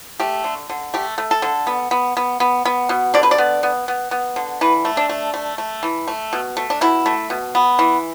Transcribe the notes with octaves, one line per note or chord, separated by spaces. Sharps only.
A3 G4
D3
D3
A3 G4
A3
A4
D3
B3
B3
B3
B3
B3
B2
D3 D5
B4
D5
B3
B3
B3
B3
D3
E3 B4
A3
D4
A3
A3
A3
E3
A3
B2
A3
D4
B2 E4
A3
B2
B3
E3